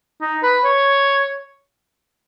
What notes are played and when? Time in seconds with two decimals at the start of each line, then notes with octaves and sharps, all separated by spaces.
0.21 D#4
0.43 B4
0.64 C#5